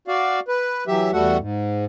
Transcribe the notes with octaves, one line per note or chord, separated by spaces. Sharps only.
F#4 D5 F5
B4
E3 F#3 G4 E5
E2 G3 A3 F#4 A4 F#5
G#2